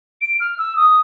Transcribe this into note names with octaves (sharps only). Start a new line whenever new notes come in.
D7
F6
E6
D#6